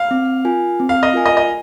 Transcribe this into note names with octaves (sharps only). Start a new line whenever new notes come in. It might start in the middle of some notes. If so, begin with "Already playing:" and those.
Already playing: F5
C4
F4 A#4 G#5
C4
F5
D#5
F4 A#4 G#5
D#5
D#5